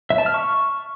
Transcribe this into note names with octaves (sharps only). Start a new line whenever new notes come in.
E5
A5
F6
C#6